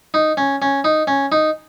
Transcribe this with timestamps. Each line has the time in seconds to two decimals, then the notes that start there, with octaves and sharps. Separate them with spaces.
0.14 D#4
0.37 C#4
0.62 C#4
0.84 D#4
1.07 C#4
1.32 D#4